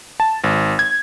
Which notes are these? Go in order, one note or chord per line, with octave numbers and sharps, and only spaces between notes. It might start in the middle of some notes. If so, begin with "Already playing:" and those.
A5
G#1
G#6